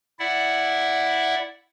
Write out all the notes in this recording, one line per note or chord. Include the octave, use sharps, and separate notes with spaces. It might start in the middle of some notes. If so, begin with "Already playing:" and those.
E4 D5 E5 F#5